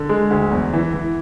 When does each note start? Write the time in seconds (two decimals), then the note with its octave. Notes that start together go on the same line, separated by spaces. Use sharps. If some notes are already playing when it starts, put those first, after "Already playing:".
Already playing: D3
0.09 G#3
0.30 D2
0.52 E2
0.73 E3
0.94 E3